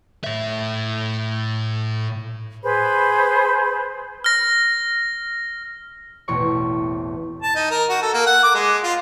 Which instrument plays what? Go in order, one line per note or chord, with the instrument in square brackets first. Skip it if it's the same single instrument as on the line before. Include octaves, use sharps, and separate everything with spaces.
[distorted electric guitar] A2 E5
[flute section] G#4 B4 C5 B5
[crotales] F6 A#6
[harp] A1 E2 B2 C4 C#5 C#6
[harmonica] A5
D#4
A#4
F#4
A4
A#3
F#5
D6
G#3
F4